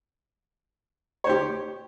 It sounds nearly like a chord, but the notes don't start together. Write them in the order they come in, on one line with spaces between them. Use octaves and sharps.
C#5 C5 G4